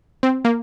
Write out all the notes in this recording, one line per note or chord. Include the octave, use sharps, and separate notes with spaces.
C4
A#3